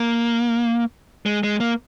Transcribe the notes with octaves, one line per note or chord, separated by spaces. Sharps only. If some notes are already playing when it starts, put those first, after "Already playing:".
Already playing: A#3
G#3
G#3
A#3